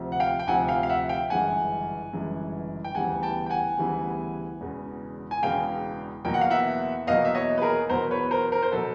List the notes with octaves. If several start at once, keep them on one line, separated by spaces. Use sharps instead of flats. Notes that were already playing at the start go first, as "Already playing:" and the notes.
Already playing: D2 C3 F3
F#5
F5 G5
G5
D2 C3 F3 F#5 G#5
F5 G5
F5
E5 F#5
F5 G5
G1 F#2 C#3 E3 G#3 F#5 G#5
G1 F#2 C#3 E3 G#3
G5
D2 C#3 E3 G3 B3 F#5 G#5
G5 A5
G5
F#5 G#5
D2 C#3 E3 G3 B3
E1 E2 C#3
G#5
E1 E2 C#3 F5 G5
E2 B2 F#3 A#3 G5
F#5
F5
E5 F#5
E2 B2 F#3 A#3 D#5 F5
E5
C#5 D#5
B4
G#4 A#4
E2 B2 F#3 B3 A#4 C5
B4 C#5
A#4 C5
A#4 C5
C5
B2 F#3 B3 A4 B4